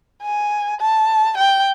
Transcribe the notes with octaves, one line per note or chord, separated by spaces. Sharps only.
G#5
A5
G5